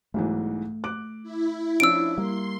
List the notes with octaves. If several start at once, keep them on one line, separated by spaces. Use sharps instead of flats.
B1 G#2 E3 A3
D6 F#6 D7
E4
F3 C#4 D4 E6 D7
G3 A#3 C6